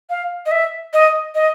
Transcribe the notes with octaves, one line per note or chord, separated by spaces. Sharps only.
F5
D#5
E5
D#5
D#5